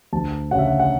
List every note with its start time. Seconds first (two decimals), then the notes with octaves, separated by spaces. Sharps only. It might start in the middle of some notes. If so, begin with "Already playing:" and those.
0.13 D2 A5
0.51 C#3 F#5
0.59 E5
0.67 F#5
0.80 F#5